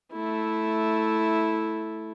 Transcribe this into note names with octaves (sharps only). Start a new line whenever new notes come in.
A3 E4